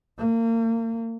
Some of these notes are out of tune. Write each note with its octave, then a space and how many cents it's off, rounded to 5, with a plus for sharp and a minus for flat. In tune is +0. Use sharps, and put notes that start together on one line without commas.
A#3 -35